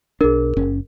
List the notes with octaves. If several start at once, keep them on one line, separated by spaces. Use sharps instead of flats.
B1 D4 G#4 A#4
F#1 C#4